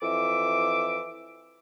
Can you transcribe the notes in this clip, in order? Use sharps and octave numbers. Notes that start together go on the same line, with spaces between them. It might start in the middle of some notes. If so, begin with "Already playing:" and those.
F2 E3 E5 D6